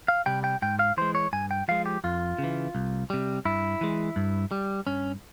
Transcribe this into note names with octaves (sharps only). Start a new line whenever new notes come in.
F5
C3 G3 G5
G5
G#2 G5
F5
E3 G#3 C5
C#5
G2 G#5
G5
F3 G#3 F5
G4
F2 F4
C#3
E3
C2
C3 G3
G2 E4
E3 G#3
G2
G3
G2 C#4